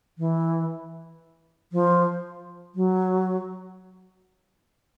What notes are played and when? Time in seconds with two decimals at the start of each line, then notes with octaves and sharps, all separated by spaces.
0.18 E3
1.72 F3
2.75 F#3